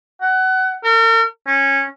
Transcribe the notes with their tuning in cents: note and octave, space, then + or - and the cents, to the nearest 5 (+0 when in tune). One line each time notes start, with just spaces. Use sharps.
F#5 +25
A#4 -40
C#4 -15